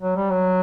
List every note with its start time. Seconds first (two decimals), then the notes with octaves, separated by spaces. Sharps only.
0.01 F#3
0.16 G3
0.31 F#3